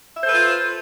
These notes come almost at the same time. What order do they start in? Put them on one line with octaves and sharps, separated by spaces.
E5 C5 A4 B4 F4